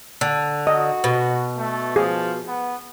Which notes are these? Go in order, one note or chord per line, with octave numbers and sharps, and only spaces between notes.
D3
F#4 D#5
B2
A3
F3 G#4
B3